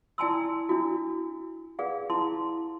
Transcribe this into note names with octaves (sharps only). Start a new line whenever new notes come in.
E4 D5 G#5 A5 C6 E6
D4 E4 F#4
G#4 B4 D5 F5 F#5
E4 A5 C6